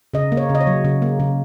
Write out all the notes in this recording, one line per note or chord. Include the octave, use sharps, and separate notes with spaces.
C#3 D#5
A#3
C#5
C#3
D#5
C#5
F#3
C#3
A#3
C#3